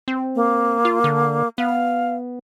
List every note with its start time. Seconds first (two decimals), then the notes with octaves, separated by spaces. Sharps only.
0.08 C4
0.36 A#3
0.85 F4
1.04 D3
1.58 B3 F5